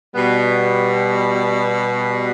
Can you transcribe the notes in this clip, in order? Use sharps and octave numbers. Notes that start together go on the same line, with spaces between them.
B2 G3 B3